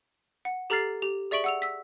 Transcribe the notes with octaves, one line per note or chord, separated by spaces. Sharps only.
F#5
G4 A4 A#5 F6 A6 C7
G4 F7
G#4 D5 E5 C#6 D7 F#7
F#5 E6 F7
E6 B6